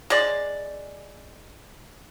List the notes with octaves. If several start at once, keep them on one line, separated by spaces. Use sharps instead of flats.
G#3 D5